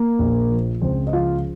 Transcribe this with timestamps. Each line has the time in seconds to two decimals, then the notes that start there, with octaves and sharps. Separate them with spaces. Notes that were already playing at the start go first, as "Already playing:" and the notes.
Already playing: A#3 A#4
0.19 A#1
0.51 F3
0.82 C#2 C4 C5
1.07 D#5
1.13 F3 F4 F5